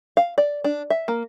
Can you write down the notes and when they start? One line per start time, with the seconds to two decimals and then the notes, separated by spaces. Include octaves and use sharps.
0.17 F5
0.38 D5
0.64 D4
0.90 E5
1.08 A#3